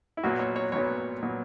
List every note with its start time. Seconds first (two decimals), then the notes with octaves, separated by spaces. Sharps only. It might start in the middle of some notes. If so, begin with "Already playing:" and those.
0.17 E4
0.23 B1 A#2 F#3 B3 F#4
0.39 C#5
0.56 C#5
0.72 B1 A#2 F#3 B3 C#5
1.22 A#2 F#3 B3